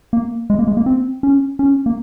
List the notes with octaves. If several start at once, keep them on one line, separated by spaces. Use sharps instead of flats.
A#3
G#3
A#3
G#3
A#3
C4
C#4
C#4
A#3